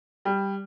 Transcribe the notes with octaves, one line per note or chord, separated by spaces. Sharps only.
G3